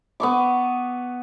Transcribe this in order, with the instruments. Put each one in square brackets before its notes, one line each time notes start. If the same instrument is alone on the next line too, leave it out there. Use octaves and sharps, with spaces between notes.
[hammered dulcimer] B3 C#6 D6